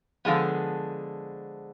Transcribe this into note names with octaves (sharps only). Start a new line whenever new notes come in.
D3 F3 G#3 B3